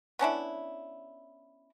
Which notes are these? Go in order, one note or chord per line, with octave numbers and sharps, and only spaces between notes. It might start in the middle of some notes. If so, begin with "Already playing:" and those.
B3 C#4 D4 E4